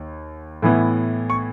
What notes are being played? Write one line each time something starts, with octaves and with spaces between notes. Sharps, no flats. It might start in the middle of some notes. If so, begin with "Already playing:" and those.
Already playing: D#2
A2 E3 B3
C#6